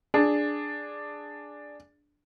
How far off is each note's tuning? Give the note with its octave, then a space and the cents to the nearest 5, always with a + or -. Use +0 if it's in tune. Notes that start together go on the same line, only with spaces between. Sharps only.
D4 +0 G#4 +0